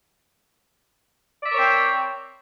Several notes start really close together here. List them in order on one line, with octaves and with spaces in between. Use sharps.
D5 E5 A#4 C#5 C4